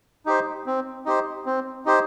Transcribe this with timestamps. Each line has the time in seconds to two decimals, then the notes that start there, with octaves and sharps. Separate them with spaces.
0.26 D#4 G4 C5
0.66 C4
1.06 D#4 G4 C5
1.46 C4
1.85 D#4 G4 C5